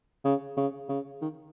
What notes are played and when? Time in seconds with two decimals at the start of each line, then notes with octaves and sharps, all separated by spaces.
0.25 C#3
0.57 C#3
0.89 C#3
1.22 D#3